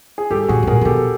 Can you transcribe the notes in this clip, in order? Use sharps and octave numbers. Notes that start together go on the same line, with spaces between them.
G#4
G2 G4 A4
A2 F#4 G#4
A2
A#2 G#4 A#4
C3
B2 G4 A4